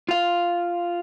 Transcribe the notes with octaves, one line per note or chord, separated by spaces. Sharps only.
F4 F5